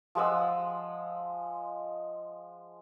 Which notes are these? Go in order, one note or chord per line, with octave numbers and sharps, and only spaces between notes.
F3 G#3 F#5 E6